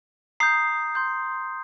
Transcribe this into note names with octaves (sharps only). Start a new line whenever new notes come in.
A#5 D#6 G6 C7
C6 G6